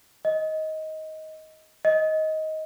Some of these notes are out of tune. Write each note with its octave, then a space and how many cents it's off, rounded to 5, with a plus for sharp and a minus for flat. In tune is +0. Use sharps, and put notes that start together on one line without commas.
D#5 +15
D#5 +15